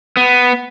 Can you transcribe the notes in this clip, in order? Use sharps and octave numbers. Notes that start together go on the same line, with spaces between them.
B3